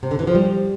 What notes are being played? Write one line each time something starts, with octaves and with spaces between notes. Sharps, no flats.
C3
D3
E3
F3
G3